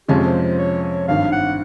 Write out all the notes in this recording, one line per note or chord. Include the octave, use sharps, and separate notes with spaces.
F2 C3 F3 G#3 C#4 G4
C5
C5
C#5
C#5
G#1 G2 D#3 F5
F#5